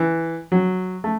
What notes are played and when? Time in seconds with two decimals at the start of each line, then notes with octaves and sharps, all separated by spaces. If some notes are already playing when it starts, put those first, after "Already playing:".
Already playing: E3
0.52 F#3
1.04 A3